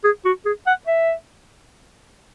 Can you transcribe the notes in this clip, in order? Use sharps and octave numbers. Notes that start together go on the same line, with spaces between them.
G#4
F#4
G#4
F#5
E5